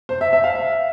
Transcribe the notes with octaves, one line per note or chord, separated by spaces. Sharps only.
C5
E5
E5
F5
E5